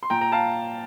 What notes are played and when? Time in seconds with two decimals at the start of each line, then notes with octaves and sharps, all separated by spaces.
0.03 C6
0.10 A#2 G5 A#5
0.21 A#5
0.32 F5 A5